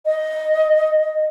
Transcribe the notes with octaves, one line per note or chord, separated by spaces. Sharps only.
D#5